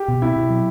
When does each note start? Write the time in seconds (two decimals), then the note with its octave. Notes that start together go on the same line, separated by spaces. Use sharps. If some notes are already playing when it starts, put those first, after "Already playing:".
Already playing: G4
0.08 B2
0.21 C4 E4
0.36 B2
0.50 F#3